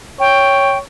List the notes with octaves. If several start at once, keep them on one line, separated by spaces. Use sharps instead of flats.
C#5 G5